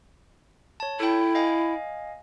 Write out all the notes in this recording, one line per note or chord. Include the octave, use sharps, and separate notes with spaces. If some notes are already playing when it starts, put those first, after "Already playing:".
C#5 A5
E4 A4 G5
D#5 F5 G#5